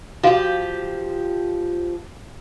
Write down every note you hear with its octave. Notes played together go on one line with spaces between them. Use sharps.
F3 F#4 G4 F5